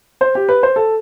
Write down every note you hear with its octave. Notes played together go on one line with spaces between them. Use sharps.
C5
G4
B4
C5
A4